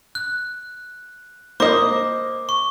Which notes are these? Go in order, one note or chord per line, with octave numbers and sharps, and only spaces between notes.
F#6
A#3 C5 D#5 D6
C#6